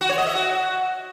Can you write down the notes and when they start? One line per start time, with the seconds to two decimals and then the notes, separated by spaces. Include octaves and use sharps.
0.01 F#4
0.09 C#5
0.18 D#5
0.26 E5
0.35 F#4